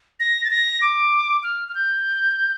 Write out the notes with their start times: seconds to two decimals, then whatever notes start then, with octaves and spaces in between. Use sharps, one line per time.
0.20 A#6
0.44 A6
0.51 A#6
0.82 D6
1.43 F6
1.68 F6
1.75 G6